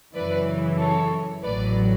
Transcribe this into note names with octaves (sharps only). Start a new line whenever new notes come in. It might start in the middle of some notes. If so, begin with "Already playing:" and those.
F#2 C#3 E3 B4 D5
A4 C#5
A1 A2 F#3 B4 D5